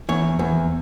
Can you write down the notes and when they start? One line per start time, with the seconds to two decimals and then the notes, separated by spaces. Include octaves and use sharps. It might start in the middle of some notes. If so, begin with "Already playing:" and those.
0.09 E2 C#5
0.39 E2